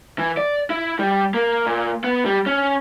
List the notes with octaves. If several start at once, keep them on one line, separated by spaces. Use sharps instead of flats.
E3
D5
E4
G3
A#3
A#2
B3
G3
C#4